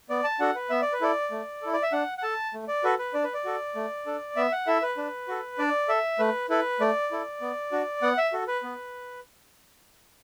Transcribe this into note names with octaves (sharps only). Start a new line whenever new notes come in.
B3 D5
A5
D4 F#4 A4 F#5
B4
B3 E5
D5
B4
E4 A4 D5
A3
E4 A4
D5
E5
D4 F#5
F#5
A4 A5
A3
D5
F#4 A4 B4
B4
D4 D5
B4
D5
F#4 A4
A3
D4 A4
B3 E5
F#5
E4 A4 E5
B4
D4
F#4 A4
D4 D5
A4 E5
A3 B4
E4 A4 B4
A3 D5
E4 A4
B3
D4 F#4
B3 F#5
E5
F#4 A4
B4
B3